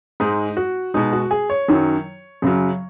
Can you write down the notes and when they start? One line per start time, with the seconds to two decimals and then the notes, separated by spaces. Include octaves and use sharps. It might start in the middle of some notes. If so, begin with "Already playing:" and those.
0.20 G#2 G#3 D#4
0.57 F#4
0.94 B2 G#3 D#4
1.13 F#4
1.31 G#4
1.50 C#5
1.68 F#2 D#3 F#3
2.42 F#2 C#3 F#3